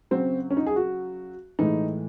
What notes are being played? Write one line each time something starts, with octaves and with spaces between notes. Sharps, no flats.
C#3 F#3 C4
C#4
D#4
G#4
F#4
A2 E3 G#3 D#4